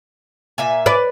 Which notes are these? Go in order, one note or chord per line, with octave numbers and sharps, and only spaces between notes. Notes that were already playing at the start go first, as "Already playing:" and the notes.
A#2 E5 G#5
B4 D5